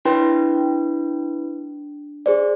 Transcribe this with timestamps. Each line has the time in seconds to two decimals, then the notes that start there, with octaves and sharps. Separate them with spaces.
0.05 D4 E4 B4 G5 C6
2.26 G#4 C5 D5